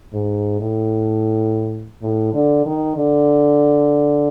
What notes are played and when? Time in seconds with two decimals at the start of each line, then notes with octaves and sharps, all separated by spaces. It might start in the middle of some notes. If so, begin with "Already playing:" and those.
0.13 G#2
0.60 A2
2.02 A2
2.33 D3
2.65 D#3
2.97 D3